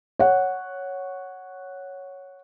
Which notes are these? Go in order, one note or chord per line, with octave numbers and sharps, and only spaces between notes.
C#5 F#5